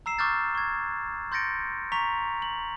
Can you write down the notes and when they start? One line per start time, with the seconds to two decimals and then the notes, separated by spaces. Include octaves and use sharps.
0.06 A#5 E6 C7 E7
0.19 C#6 D6 E6 F6 G6 A6
0.55 C#6 G#6
1.32 C6 G6 A6 A#6 C#7 D7
1.92 A#5 C#6 B6 F7
2.42 F#7